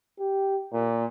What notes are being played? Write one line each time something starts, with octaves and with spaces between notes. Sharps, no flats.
G4
A#2